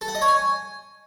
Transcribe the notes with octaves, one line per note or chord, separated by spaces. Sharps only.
A4
F#5
D#5
C#5
G#5